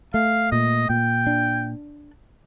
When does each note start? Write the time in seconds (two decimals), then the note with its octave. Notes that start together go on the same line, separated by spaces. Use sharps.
0.14 A3 F5
0.52 A#2 D#5
0.89 A#2 G5
1.27 D4